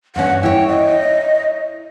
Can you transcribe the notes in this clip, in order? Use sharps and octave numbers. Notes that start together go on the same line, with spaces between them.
G2 C#4 F#5
E4 C#5 G5
D#5